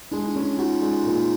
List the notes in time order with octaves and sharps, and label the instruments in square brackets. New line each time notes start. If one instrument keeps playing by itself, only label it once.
[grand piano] G#3 [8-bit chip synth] D4 E4
[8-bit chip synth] D4 E4
[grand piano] C#4
[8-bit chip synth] D4 E4
[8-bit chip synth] D#4 F4 [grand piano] F#4
[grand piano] G#3
A#2